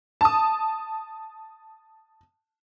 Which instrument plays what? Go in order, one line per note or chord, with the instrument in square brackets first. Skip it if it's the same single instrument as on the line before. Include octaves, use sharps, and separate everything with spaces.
[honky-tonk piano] A5 D#6